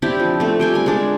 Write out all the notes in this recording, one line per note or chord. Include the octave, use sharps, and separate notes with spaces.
C4 D4 E4 G4
F3
A3 C4
G3 G5 G#5
A#4 G#5
G#3 D4 A#4